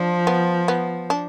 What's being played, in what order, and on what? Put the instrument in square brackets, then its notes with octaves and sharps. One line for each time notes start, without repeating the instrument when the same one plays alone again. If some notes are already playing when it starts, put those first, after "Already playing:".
Already playing: [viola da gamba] F3 [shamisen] D4
[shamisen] B3
B3
D4